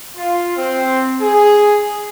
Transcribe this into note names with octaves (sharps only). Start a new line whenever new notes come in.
F4
C4
G#4